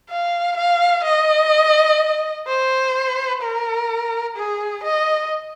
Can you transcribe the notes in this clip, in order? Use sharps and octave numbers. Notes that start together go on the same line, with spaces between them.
F5
F5
D#5
C5
A#4
G#4
D#5